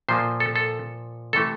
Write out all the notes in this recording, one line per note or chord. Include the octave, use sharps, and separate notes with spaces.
A#2 F3 A#3 C5
A4
A4
C3 E3 A3 A4